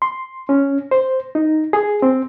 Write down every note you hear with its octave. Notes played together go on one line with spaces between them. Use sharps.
C6
C#4
C5
D#4
G#4
C4